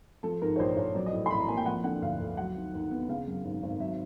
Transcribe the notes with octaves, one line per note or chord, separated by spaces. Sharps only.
F3 A4
G#2 A#4
C#5
A#1 C5
A#1 C#5
F#3 D5
D#5
A2
C6
A1 B5
A#5
A#3 G#5
G5
F3 F#5
D3 F#5
D2 F5
D2
F#3 F#5
D#3
D#2
B3
C#3 F5
F#2
G#1
G#1
F#3 E5